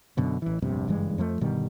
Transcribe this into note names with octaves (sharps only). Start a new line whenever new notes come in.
F#2 B2 D3
A1 E3
E1 A#1 G2 C3
F#1 G2 E3 G#3
F2 F3 A3
G1 B2 D#3 G3